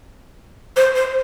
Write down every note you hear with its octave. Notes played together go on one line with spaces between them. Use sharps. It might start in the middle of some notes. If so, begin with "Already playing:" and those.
C5
C5